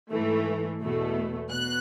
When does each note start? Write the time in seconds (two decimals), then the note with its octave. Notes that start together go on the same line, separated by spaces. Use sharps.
0.11 G#2 E3 A3
0.81 E2 B2 A3
1.50 B2 F#6